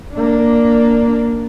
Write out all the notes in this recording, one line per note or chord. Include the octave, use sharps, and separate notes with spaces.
A#3 D4